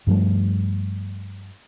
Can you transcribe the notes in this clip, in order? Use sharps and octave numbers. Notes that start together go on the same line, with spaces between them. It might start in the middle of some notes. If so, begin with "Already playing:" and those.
G2 F3 G3 A3